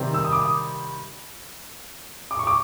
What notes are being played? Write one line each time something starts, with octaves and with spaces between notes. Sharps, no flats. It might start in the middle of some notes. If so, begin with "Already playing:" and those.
Already playing: C3 D#3 G3 C4
E6
D#6
D6
D#6
D6
C#6
D6